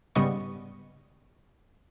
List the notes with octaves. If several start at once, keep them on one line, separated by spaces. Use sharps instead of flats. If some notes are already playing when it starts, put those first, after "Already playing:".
G#2 C#3 G3 B3 D#5 C#6